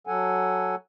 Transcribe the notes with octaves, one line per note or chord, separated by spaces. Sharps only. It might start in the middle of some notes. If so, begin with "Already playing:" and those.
F#3 A4 F#5 G#5